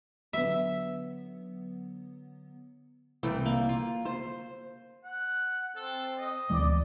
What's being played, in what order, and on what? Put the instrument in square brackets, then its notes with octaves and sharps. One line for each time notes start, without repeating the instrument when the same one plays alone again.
[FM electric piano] D3 F#3 B3 [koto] E5
[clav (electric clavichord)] C2 E3 A3 [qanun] G5
[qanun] A#3
[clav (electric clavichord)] F4
[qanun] C5
[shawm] F#5
[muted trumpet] C4 [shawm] A4
[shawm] D#5
[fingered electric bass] D2 E3 G#3 [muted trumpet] D5